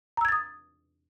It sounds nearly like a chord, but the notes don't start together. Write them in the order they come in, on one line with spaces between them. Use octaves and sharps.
A#5 E6 G#6 A6 D#6